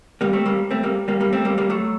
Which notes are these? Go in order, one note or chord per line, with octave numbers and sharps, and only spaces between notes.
G3 A#3
A3 C4
G3 A#3
A3 C4
G3 A#3
G3 A#3
G3 A#3
A3 C4
G3 A#3
G3 A#3
F#3 A3